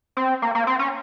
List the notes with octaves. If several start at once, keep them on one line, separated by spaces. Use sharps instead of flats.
C4
A#3
A#3
C4
C#4